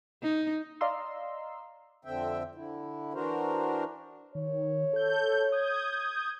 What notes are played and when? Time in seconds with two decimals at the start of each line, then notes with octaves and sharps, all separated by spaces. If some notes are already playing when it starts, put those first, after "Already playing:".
0.23 D#4
0.81 D5 D#5 F5 A#5 C6 E6
2.05 F2 D3 C4 E5 G5
2.55 D3 E4
3.14 E3 D4 F#4 A#4 C5
4.35 D#3 C#5
4.93 A4 G6
5.52 D#6 G6 G#6